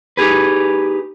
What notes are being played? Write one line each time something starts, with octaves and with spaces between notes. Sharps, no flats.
D#4 G4 G#4 B4